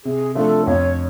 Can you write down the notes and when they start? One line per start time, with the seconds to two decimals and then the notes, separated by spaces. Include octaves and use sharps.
0.05 C3 G#4
0.35 F3 A3 D4 F4 A4
0.66 F2 C#5